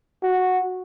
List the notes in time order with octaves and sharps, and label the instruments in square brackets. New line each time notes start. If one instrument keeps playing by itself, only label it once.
[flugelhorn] F#4